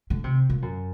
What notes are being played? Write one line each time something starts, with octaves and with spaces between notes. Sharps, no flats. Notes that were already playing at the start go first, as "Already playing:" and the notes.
D3
C3
A#2
F#2